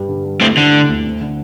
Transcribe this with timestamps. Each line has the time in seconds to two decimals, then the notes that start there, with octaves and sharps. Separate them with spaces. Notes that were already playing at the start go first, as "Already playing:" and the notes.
Already playing: G2 G3
0.08 D3
0.24 G3
0.40 A3 C4 E4
0.56 D3 E4
0.73 A3
0.89 D2
1.04 C4
1.21 D3